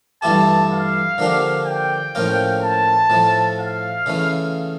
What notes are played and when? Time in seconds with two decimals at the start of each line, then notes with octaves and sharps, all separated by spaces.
0.22 G2 E3 A3 E4 G4 A5
0.71 F5
1.18 D3 F3 A#3 D4 G4
1.66 G5
2.15 A2 F3 A#3 C#4 F4
2.62 A5
3.10 A2 F3 A3
3.59 F5
4.06 C#3 E3 A3 C#4